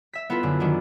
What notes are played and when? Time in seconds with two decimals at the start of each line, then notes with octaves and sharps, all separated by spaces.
0.13 E5 B6
0.30 B3 E4 F4 A4 B4
0.43 F#2 D3
0.60 D#3 F#3 D4 E4